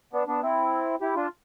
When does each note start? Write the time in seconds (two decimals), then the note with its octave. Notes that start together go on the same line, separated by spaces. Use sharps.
0.13 B3 D4
0.27 B3 D4
0.42 C4 E4
1.01 E4 G4
1.15 D4 F4